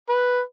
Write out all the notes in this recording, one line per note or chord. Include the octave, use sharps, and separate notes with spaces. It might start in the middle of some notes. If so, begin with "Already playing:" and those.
B4